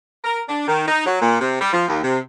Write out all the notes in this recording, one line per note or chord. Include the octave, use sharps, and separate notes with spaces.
A#4
D4
D#3
D#4
F#3
A#2
C3
G3
F3
D#2
C3